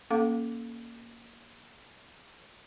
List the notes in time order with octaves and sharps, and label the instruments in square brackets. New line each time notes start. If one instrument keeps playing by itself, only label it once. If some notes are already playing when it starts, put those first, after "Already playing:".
[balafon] A#3 C#4 A4 F5 D6